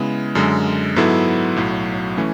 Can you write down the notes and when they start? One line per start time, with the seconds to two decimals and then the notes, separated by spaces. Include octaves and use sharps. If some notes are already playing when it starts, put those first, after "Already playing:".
Already playing: C#3 G#3 B3 E4
0.35 F#2 D3 G#3
0.96 G#2 F#3 B3 E4 A4
1.56 B1 A2 F#3
2.17 E3 A3 C#4